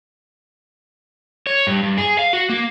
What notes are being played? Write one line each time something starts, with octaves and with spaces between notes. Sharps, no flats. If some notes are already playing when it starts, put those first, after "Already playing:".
C#5
G2
G2
G#4
F5
F#4
A#3